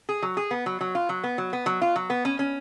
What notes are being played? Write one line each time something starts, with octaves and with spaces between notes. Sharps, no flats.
G#4
F#3
G#4
B3
F#3
F#3
F4
F#3
B3
F#3
B3
F#3
F4
F#3
B3
C#4
C#4